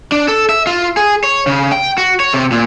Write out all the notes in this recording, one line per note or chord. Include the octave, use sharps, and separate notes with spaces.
D4
A4
E5
F4
G#4
C#5
C#3
G5
F#4
C#5
C3
A#2